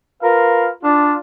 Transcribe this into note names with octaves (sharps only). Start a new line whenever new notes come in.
F4 A#4 B4 F5
D4 F4